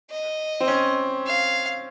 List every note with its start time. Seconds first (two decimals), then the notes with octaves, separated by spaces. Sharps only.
0.10 D#5
0.60 C4
0.68 C#4
1.26 F5